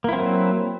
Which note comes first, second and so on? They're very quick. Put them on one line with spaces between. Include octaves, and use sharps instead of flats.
A#3 E4 C4 F#3